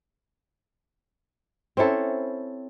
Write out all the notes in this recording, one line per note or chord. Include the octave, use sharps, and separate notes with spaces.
C4 C#4 E4 A4